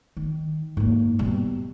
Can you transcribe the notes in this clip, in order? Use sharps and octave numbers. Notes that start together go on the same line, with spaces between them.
D#3
G#2 A#3
B2 G3